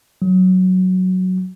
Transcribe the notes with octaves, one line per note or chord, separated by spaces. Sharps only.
F#3